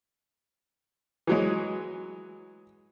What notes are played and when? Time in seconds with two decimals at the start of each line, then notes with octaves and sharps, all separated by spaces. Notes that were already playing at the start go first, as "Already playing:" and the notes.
1.27 E3 F#3 G#3